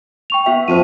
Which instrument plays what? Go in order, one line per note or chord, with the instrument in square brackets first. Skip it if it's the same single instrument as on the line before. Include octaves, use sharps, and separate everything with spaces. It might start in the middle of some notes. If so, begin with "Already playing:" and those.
[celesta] G5 C#6 F7
[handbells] B3 F#4 E5
[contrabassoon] F2 [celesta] C5 D#7